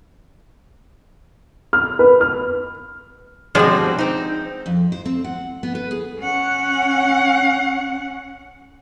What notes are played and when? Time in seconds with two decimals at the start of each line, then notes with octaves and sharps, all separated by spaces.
1.73 F6
1.99 B4
2.21 F6
3.55 B2 F3 G3 G#3 C4 D4
3.98 C4 D#4
4.66 F2
4.92 C5
5.05 C4
5.24 F#5
5.63 B3
5.75 B4
5.91 G#4
6.21 C#4 F#5